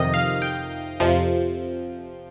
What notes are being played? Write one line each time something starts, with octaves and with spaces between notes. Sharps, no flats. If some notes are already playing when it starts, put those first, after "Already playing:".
Already playing: F2 C3 D#3 D#5
F5
G5
F2 C3 F3